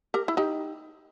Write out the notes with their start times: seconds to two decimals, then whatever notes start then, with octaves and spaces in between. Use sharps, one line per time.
0.14 G4 A#4
0.28 E4
0.37 D#4 G4